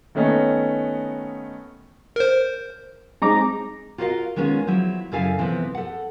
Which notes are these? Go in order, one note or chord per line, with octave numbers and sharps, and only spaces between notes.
D#3 A3 B3 C#4 D#4
A#4 C5
G#3 C4 D#4 G#4 A#5 D6
F4 F#4 A#4 C5 D#5 F5
D#3 G#3 B3 C#4 F4
F3 F#3 E4
F#2 C#3 E4 A4 F5 G#5
C3 E3 F3 B3
A4 F#5